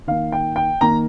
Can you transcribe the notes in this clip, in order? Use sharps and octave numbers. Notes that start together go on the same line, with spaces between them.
D#3 A#3 F5
G5
G5
D#3 A#3 A#5